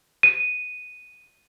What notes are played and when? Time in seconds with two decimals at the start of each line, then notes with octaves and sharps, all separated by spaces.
0.23 D#7